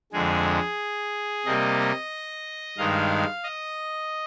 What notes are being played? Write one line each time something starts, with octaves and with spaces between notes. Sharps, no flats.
F2 D3 G#3 G#4
C3 G3 A#3 D#5
G2 D#3 G#3 F5
D#5